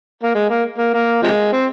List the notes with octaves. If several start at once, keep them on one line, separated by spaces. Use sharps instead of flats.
A#3
G#3
A#3
A#3
A#3
C3 F3 G#3
C4